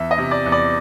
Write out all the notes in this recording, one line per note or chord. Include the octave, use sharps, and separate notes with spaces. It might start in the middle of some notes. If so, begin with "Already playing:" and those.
Already playing: E2 E5
D#5
C3
D5
E2
D5